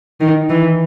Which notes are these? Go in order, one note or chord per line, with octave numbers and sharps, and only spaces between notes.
D#3
E3